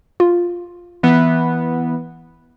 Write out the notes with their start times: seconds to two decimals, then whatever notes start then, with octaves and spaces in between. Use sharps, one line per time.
0.20 F4
1.03 E3 B3